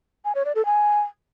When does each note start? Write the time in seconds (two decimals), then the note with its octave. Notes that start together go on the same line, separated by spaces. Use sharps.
0.25 G#5
0.35 C#5
0.45 D5
0.55 A4
0.65 G#5